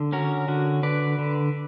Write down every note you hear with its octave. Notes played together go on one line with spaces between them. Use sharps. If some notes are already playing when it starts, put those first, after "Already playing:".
Already playing: D3
C#4 F#4 A#4
D3 F#4
D3 B4 D5
D3